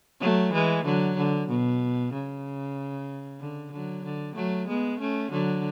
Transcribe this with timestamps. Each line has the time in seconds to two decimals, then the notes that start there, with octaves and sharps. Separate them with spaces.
0.21 F#3 A3
0.53 E3 G#3
0.85 D3 F#3
1.18 D3
1.48 B2
2.13 C#3
3.40 D3
3.72 D3 F#3
4.04 D3
4.36 F#3 A3
4.68 G#3 B3
5.00 A3 C#4
5.31 D3 F#3